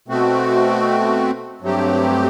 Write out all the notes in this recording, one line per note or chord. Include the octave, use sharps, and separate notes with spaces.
B2 A3 C4 F#4
G2 F#3 A3 C4 G4